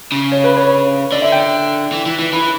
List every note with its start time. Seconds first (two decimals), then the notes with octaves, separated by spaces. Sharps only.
0.12 C#3
0.32 C#5
0.44 B4
0.57 C#5
1.12 D3 D5
1.22 E5
1.32 G5
1.92 E3
2.06 E3
2.19 E3
2.32 E3 B5